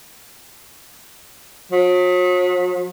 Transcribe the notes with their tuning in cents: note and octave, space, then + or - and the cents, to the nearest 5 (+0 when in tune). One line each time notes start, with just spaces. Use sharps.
F#3 -45